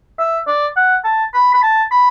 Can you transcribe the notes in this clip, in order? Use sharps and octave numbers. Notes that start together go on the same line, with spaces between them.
E5
D5
F#5
A5
B5
B5
A5
B5